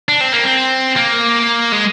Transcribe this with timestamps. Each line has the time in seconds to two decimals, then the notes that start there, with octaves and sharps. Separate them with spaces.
0.09 D4
0.21 C4
0.33 A#3
0.44 C4
0.96 A#3
1.72 G#3